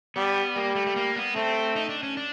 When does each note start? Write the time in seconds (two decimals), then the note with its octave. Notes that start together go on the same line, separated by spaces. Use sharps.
0.16 G3 B3
0.56 G3 A#3
0.75 A3
0.86 A3
0.96 A#3
1.16 B3
1.35 A3 C4
1.76 D#4
1.89 D4
2.03 C#4
2.17 D4